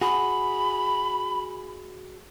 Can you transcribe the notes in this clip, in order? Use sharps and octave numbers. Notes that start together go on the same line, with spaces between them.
F#4 G#4 B5